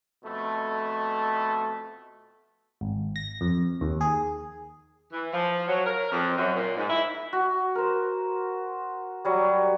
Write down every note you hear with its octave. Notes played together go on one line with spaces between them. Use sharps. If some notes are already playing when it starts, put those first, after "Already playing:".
F2 B2 A3
G#1
A#6
F2
D#2
G#4
E3
F3
F#3
A#4
F2
F#2
A#2
G#2
E4
F#4
A#4 C5
F#3 G3